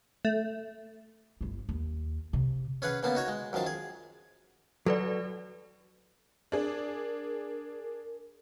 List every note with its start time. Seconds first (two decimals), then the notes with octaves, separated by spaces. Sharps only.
0.25 A3
1.41 G1 E4
1.69 D#2
2.33 C3
2.82 C#4 G#4 B4 F5 F#5
3.03 C#3 A#3 B3 A5
3.15 D#4 F#4 C#5
3.28 G#3
3.53 F#2 D#3 F3 F5 A5
3.67 G#4
4.86 F#3 A4 B4 D5
6.52 D4 G#4 A#4